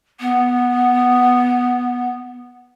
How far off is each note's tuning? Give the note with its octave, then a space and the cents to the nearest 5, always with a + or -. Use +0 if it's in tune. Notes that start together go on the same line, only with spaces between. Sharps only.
B3 -5